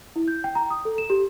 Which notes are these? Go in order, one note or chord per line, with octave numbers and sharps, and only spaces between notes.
E4
G6
G5
A#5
D#6
A4
E7
G4